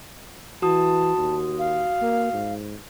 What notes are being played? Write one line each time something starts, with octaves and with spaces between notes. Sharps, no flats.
E3 F#4 A5 D#6
D#2
F5
A#3
G#2